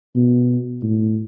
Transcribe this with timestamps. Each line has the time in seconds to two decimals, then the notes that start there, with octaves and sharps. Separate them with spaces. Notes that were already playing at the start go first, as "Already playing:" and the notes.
0.15 B2
0.83 A2